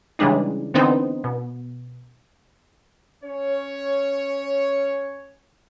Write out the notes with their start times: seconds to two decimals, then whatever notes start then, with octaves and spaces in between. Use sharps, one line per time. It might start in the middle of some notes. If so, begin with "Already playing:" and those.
0.19 C#3 E3 G3 G#3 D4 D#4
0.74 D3 E3 B3 C4 D#4
1.24 B2
3.24 C#4 C#5